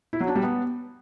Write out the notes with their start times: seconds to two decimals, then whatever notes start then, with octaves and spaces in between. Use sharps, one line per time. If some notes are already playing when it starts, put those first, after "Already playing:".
0.13 E4
0.20 F#3
0.28 D4
0.35 G3
0.43 B3